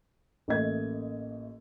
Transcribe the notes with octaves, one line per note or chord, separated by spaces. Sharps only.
A1 A3 A#3 D#5 G#6